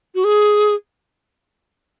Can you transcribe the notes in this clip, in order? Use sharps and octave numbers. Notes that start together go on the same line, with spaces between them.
F#4
G#4